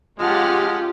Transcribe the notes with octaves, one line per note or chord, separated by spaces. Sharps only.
G#3 C#4 F4 G4 F#5 A5 F6